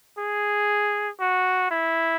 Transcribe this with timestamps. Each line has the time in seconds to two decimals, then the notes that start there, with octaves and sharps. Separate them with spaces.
0.18 G#4
1.20 F#4
1.71 E4